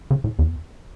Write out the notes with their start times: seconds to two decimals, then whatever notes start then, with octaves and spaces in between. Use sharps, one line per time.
0.11 C#3
0.24 A2
0.39 E2